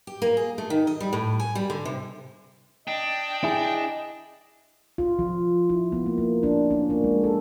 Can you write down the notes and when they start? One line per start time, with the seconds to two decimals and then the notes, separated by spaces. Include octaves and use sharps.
0.07 G4
0.22 A#3
0.37 G#4
0.58 A3
0.70 D#3
0.87 D#5
1.00 G3
1.13 A2
1.40 G#5
1.55 G3
1.70 D3
1.85 C3
2.88 D4 D#5 G5
3.44 E4 G#4
4.98 F4
5.19 F3
5.69 E4
5.92 B3
6.06 A#3
6.18 A#3
6.43 D4
6.71 C#4
6.90 A#3
7.04 G#3
7.24 A4